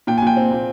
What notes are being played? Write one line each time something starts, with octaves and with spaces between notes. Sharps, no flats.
A#2 G5
G#5
A#2 G5
C4
A#2